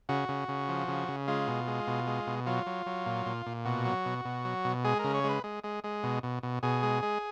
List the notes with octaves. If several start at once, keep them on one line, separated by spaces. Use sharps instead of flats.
C#3 F#4
C#3
C#3
F3
C#3
C#3
G#3 F4
B2
G#3
B2
G#3
B2
F#3 F4
F#3
F#3
A#2
A#2
A#2
B2 F#4
F#3
B2
B2
F#3
B2
G#3 G#4
C#3 A#4
C#5
G#3 B4
G#3
G#3
G#3
B2
B2
B2
B2 G#4
G#3
G#3